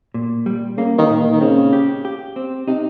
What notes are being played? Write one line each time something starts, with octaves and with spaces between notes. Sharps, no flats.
A#2
G3
C#3 A#3
D#3
A#2
D#3
D#3
C#3 C4
G4
G4
C4
C3 D#4